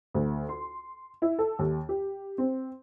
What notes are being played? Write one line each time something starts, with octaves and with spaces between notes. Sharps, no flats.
D2
C6
E4
A4
D#2
G4
C4